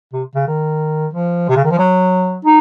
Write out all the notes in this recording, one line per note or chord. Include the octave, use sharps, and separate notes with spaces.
C3
C#3
D#3
F3
C3
C#3
D#3
F3
F#3
D#4